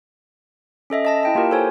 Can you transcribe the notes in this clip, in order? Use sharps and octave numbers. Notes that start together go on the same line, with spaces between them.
C#4 A4 D#5 E5
D#5 A5 A#6
E4 G5 A5
A#3 F4 G4 A#4
A4 C5 C#5 G#5